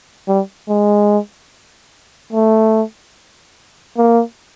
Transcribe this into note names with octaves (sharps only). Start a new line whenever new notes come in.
G3
G#3
A3
A#3